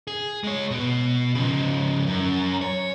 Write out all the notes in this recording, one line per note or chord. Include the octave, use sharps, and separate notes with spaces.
G#4
G#3 C#5
B2 B3
C#3 F3
F#2
C#5